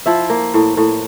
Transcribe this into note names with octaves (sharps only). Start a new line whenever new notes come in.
F3 E4 E5
A#3
A2
A2